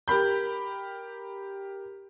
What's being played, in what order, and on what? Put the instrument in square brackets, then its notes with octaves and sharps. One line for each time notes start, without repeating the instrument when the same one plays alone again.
[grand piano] G4 A#4 B5 G6